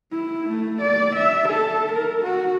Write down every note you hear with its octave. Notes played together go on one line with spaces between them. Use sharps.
E4
A3
D5
E5
A4
A#4
F#4